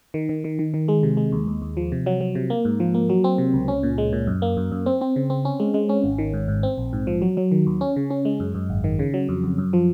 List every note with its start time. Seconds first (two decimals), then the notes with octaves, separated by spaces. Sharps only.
0.14 D#3
0.29 D#3
0.44 D#3
0.59 D#3
0.74 D#3
0.88 G#3
1.03 C3
1.17 G#3
1.32 D#2
1.47 D#2
1.62 D#2
1.77 F3
1.92 C3
2.06 F#3
2.21 F#3
2.35 C3
2.50 A#3
2.65 G#2
2.80 F3
2.94 A#3
3.09 F#3
3.24 C4
3.38 C3
3.54 C#2
3.68 C#4
3.83 A#2
3.98 G#3
4.13 A#2
4.27 F#2
4.42 A#3
4.57 F#2
4.72 F#2
4.86 C4
5.01 C4
5.16 C#3
5.30 C4
5.45 C#4
5.60 G#3
5.74 G#3
5.89 C#4
6.04 G#1
6.18 D#3
6.33 G#2
6.48 G#2
6.63 C4
6.78 A#1
6.93 G#2
7.07 F3
7.22 F#3
7.37 F#3
7.51 D#3
7.66 D#2
7.81 C#4
7.96 C#3
8.10 C#4
8.25 G#3
8.40 F#2
8.55 F#2
8.70 G#1
8.84 D#3
8.99 C#3
9.14 F#3
9.29 F2
9.44 F2
9.58 F#2
9.73 F3